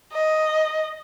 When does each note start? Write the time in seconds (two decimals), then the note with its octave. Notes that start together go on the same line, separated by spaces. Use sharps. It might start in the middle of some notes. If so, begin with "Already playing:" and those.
0.13 D#5